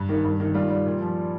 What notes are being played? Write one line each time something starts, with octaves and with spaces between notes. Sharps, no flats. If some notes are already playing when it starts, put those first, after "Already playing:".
Already playing: G2
D#3
G2
D#3
G3 F4
G3
A#2
F3